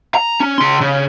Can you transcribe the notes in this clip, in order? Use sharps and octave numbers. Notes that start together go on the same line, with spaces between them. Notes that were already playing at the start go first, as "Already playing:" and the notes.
A#5
C#4
C#3 C6
C#3